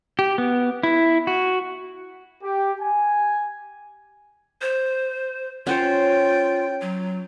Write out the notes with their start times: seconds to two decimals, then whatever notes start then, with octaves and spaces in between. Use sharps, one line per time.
0.19 G4
0.38 B3
0.83 E4
1.27 F#4
2.42 G4
2.81 G#5
4.61 C5
5.67 C#4 F4 C5 C#5 G5
6.82 F#3